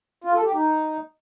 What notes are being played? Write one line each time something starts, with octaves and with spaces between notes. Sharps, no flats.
F4
A4
G4
D#4